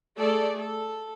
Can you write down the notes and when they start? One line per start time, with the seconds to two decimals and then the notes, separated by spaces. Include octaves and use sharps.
0.19 A3 G#4 A4 D5
0.60 A4